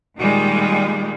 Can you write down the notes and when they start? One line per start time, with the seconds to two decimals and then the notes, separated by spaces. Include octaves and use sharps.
0.17 A#2 D#3 G3 G#3